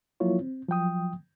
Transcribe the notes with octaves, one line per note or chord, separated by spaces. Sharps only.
F3 F#3 A#3 E4 F4 C#5
C4
F3 F#3 G5 D#6